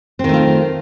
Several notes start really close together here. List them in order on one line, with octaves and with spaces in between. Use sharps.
C4 D#3 A3 F4